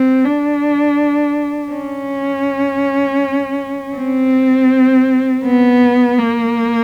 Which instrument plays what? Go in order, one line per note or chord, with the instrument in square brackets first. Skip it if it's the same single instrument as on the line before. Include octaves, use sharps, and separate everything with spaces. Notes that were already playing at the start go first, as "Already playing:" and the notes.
Already playing: [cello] C4
D4
C#4
C4
B3
A#3